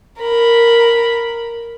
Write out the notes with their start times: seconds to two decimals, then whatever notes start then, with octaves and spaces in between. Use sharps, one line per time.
0.20 A#4 B5